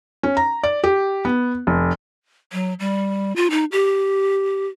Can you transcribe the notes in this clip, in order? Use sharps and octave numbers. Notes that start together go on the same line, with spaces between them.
C#4
A#5
D5
G4
B3
F1
F#3
G3
F4
D#4
G4